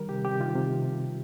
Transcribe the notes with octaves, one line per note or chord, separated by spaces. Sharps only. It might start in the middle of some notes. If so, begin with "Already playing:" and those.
Already playing: D#3 G3 A#4
C3 G4
C3 G4
D#3 F4
C3